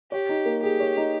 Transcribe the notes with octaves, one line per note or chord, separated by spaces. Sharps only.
G4 C#5
D#4
A#3
G4 G#4
C#5
D#4